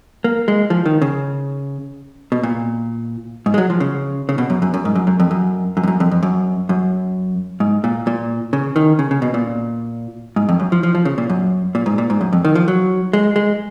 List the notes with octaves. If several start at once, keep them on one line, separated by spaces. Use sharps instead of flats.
A#3
G#3
F3
D#3
C#3
B2
A#2
G#2
G#3
F#3
F3
C#3
C#3
B2
F#2
F#2
F#2
G#2
F#2
F#2
F2
F#2
F#2
F2
F#2
F2
F2
F#2
F#2
G#2
A#2
A#2
C#3
D#3
C#3
C#3
B2
A#2
G#2
F2
F#2
F3
F3
F3
C#3
A#2
F#2
A#2
G#2
A#2
G#2
F#2
F2
D#3
F3
F#3
G#3
G#3